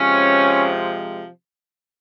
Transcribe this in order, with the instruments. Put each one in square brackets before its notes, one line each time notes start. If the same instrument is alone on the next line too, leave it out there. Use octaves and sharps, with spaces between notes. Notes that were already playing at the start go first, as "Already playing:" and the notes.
Already playing: [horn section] C3 F3 G#3 C#4